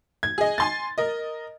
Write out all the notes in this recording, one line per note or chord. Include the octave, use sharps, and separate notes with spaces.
G#6
G#4 D#5
G#5 C6 A6
A#4 D#5